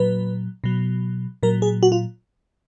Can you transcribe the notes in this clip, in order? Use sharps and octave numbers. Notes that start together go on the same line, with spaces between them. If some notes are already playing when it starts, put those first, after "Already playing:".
Already playing: A#2 F#3 B4
B2 F#3
A#2 F#3 A#4
G#4
F#4
F4